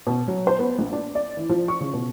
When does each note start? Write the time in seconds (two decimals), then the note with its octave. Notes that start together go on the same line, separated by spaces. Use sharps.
0.07 B2
0.28 F#3
0.47 C5
0.59 B3
0.78 A#1
0.93 D4
1.15 D5
1.37 E3
1.49 F3
1.68 C#6
1.81 C#3
1.94 B2